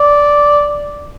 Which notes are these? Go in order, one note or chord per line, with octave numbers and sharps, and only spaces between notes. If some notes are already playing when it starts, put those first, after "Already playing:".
Already playing: D5